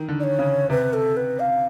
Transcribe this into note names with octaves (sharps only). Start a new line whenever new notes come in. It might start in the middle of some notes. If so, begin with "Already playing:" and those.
Already playing: D#3 E3
D3
D5
C#5
C#3
C3 B4
A4
B4
F5